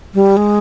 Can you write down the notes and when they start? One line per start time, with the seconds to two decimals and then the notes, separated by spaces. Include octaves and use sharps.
0.14 G3
0.37 G#3